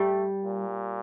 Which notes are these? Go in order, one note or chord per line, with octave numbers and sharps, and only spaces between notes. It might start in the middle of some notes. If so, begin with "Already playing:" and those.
Already playing: G3 A3
A#2